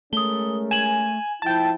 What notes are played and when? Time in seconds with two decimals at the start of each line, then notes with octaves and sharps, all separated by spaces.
0.13 G#3 A3 C#4 A#4 D#6 G7
0.71 G#5 E7 F#7
1.42 F3 E4 G5 A5